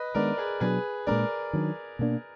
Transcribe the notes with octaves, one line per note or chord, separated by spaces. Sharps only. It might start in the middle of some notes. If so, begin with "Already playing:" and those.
Already playing: B4 D#5
D#3 G#3 B3 D4 A#4 D5
G#4 B4
B2 F#3 D4 G#4 B4
A#2 G#3 B3 D4 A#4 D5
D#3 F#3 D4
B2 A#3 D4